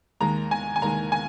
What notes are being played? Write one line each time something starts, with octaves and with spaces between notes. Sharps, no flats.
D#2 D#3 G#3 A#5
G#5
G#5
D#2 D#3 G#3 A#5
G#5